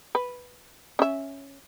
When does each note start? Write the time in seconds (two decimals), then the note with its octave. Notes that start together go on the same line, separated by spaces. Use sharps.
0.15 B4
0.99 C#4 E5